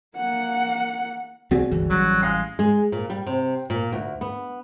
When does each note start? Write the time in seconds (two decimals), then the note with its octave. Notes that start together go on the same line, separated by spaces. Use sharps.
0.17 A#3 F#5
1.51 C2 B3 C4 F#4 G#4 D5
1.71 G1 C#2 E3
1.90 A1 E3 F#3 G3
2.22 G#3 F5 A#6 C7
2.59 G#3
2.92 A#2
3.10 G3
3.27 C3
3.70 A#2
3.93 D2
4.21 B3